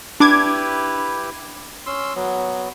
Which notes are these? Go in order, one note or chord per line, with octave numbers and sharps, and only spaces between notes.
D4 E4 G4 B4 D6 G#6
C#4 C6 E6
F#3 B3